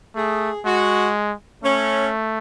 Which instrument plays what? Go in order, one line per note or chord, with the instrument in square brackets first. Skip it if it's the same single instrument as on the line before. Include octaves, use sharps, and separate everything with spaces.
[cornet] A3 [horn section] G#4
[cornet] G#3 [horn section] F#4
[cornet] A3 [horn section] C#4